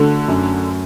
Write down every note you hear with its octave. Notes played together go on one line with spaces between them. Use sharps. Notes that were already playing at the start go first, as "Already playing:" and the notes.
Already playing: D3 A3 F#4
F#2